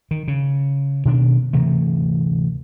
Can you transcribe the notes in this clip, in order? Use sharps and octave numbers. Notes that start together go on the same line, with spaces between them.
D#3
C#3
B2 D#3 D4
D2 C3 E3 A3